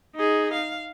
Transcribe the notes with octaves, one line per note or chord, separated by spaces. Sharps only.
D#4 G#4
F5